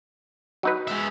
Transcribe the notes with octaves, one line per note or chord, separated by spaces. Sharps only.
F#3 D#4 B4
G#3 E5